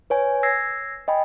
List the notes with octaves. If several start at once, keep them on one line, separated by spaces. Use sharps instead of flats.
B4 C#5 G#5
E6 G#6 A#6 C7
D#5 G5 G#5 B5